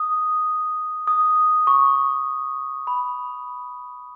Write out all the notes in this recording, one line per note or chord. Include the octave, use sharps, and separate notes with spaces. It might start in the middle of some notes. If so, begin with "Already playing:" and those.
Already playing: D#6
D#6
C#6
B5